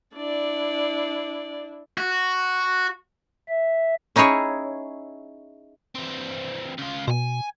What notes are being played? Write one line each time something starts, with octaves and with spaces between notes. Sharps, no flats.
D4 E4 D5
F#4
E5
C#4 D#4 E4 G#4 C#5
E3 C4
C#3 F4
B2 C5 G#5